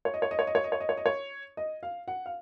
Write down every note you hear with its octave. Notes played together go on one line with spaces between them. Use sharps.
C#5
D#5
C#5
D#5
C#5
D#5
C#5
D#5
C#5
D#5
C#5
D#5
C#5
D#5
F5
F#5
F5